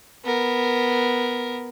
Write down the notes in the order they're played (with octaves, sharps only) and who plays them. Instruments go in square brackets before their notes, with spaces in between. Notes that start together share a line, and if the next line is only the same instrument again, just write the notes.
[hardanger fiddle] B3 A#4